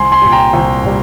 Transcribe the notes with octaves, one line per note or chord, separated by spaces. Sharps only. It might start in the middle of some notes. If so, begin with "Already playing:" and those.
Already playing: C2 G#5 C6
G#5 C6
A#2 G3
G5 A#5
C2
A#2 G3